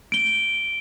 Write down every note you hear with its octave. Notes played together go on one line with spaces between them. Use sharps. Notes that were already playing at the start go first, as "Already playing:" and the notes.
D7 G7